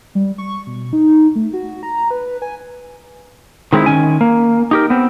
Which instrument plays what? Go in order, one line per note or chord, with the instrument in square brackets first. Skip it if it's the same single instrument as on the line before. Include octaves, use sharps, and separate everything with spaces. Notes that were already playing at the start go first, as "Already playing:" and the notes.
[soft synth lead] G3
C#6
B2
D#4
A3
F#4
A#5
B4
G#5
[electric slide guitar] D#3 G#3 C4 D#4 E4
D#3 C#4 G#5
A#3
D#4 G4 A#4
B3 C4